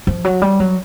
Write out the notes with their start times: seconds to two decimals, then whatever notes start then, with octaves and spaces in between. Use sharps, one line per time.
0.07 F3
0.25 F#3
0.42 G3
0.60 F#3